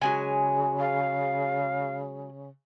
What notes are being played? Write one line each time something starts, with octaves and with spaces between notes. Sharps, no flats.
C#3 F#3 G#3 G#5
F5